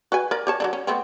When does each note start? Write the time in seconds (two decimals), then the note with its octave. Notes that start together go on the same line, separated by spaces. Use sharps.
0.12 F#4 B4 G#5
0.31 A#4 D5
0.47 G4 C#5 A5
0.60 F#3 A3 D4
0.73 C#4
0.87 A3 B3 C4